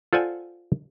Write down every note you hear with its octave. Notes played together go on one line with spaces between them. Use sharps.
F4 A4 C5 D5 F#5 G#5